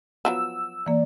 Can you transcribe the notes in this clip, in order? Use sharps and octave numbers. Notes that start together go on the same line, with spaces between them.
F3 F#3 B3 E6
E3 A#3 D5